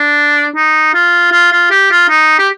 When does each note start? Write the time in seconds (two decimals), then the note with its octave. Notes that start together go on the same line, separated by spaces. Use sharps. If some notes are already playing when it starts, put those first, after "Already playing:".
Already playing: D4
0.56 D#4
0.94 F4
1.32 F4
1.52 F4
1.71 G4
1.91 F4
2.09 D#4
2.39 G4